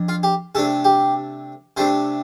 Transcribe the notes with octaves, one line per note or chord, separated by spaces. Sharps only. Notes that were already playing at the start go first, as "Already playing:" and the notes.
Already playing: F2 D4
F4
G4
C3 A3 D4 A4
G4
C3 A3 D4 C5